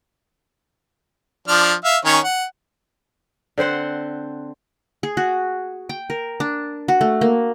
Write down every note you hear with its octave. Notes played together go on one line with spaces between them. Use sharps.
F3 D4 F6
E5 F5
D#3 C#4 C#5
F#5
D3 C4 C5 F#5
G#4
F#4
G5
A#4
D4
F#4
A3
A#3